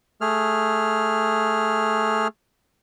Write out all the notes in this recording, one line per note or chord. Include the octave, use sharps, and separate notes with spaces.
A3 G#4 F6